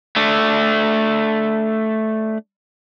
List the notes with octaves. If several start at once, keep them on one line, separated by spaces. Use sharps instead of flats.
A3 D4